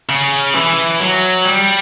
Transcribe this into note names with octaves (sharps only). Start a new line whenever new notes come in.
C#3
E3
F#3
G3